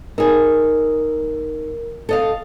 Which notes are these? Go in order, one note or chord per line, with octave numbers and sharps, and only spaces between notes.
D#4 G#4 A#4
A4 D#5 F5